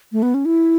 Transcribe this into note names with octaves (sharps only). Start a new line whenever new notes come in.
A3
B3
C#4
E4